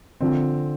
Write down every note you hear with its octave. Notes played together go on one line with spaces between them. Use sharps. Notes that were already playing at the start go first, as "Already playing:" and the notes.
D3 F3 C4